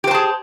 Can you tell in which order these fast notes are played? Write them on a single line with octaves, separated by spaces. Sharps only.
G4 C5 A5 G#4